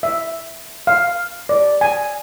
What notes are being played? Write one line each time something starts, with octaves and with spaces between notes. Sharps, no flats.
E5
F5
D5
G#5